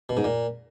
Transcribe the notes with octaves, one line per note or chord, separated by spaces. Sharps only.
B2
G#2
A#2